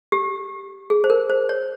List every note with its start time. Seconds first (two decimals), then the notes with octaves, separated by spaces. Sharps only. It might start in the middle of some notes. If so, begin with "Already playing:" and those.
0.12 G4
0.90 G#4
1.04 C5
1.10 A#4
1.30 C5
1.49 C#5